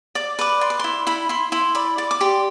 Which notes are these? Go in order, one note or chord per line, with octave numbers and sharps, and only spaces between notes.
D5 D6
B4 D6
D5 C6
D6
E4 C6
E4 B5
E4 C6
E4 C6
D5 B5
D5 D6
D6
G4 C6